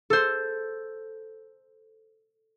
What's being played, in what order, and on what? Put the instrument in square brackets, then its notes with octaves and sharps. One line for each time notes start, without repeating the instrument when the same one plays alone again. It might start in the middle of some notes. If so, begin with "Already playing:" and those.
[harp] A4 C5